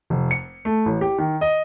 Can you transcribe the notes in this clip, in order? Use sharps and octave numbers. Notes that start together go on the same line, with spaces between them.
F1
C#7
A3
A1
G4
D#3
D#5